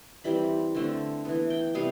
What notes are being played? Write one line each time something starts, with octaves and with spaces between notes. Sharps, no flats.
E3 G3 C4 B5
D3 A3 C4
E3 B3
G5
C3 G3 B3 F5